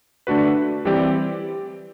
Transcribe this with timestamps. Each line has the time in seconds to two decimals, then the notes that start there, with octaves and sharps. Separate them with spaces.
0.27 D3 A3 D4 F#4 B4
0.85 E3 G3 C4 G4 D5